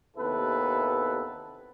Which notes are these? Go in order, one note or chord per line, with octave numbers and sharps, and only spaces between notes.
D#2 C3 B3 E4 A4 B4